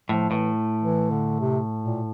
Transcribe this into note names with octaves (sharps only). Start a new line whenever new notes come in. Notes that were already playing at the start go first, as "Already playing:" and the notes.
A2 F3
A2 E3
E3
D3
C3
A#2